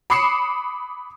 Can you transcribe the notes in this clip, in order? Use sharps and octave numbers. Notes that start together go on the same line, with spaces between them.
B5 D6 D#6 C7 C#7 E7